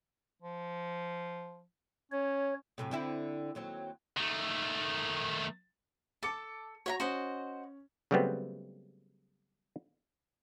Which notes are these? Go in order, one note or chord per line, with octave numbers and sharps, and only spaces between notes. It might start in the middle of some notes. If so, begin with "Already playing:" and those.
F3
C#4 C#5
F#2 A2 C3
D3 C4 E4
D#2 F#3 C4
D#3 A3
A4 A5 D6 C#7
F#4 C#5 E5 A#5
C#4 F#4 C5 D#5
C#3 F#3 G3 A3 B3 C4